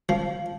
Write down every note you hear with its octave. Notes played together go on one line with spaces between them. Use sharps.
F3